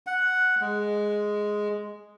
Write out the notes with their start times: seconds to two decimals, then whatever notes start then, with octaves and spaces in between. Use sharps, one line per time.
0.07 F#5
0.61 G#3